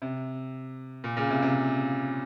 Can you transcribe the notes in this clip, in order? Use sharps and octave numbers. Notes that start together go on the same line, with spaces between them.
C3
A#2
A#2 C#3
C3
C3